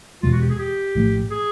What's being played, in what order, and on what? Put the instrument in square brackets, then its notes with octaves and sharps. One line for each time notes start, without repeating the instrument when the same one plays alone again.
[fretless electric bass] E2 B2 G#3 [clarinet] F4
[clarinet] F#4
G4
G#4
G4
[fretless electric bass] A#1 A2 F3 A3
[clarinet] G#4